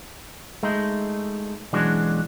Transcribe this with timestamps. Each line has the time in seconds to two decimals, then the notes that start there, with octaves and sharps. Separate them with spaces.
0.63 G#3 A3 D#4
1.73 B1 E3 G#3 C#4 D4 F#4